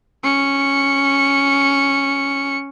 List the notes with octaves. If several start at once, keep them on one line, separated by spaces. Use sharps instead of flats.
C#4 C#7